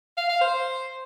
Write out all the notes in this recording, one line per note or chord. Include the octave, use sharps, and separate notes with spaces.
F5
F5
C5